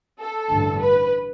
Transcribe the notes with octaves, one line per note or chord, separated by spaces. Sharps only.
A4
A1 G2 D3
B4